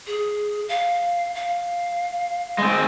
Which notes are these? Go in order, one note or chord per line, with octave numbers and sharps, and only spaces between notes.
G#4
F5
F5
G#3 C4